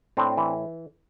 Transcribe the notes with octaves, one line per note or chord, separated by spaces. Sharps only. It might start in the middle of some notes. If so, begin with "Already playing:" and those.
A2 C4 D4
E3